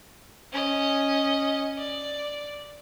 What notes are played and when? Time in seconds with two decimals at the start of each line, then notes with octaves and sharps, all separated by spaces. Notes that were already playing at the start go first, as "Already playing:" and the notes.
0.52 C#4 D#5
1.78 D5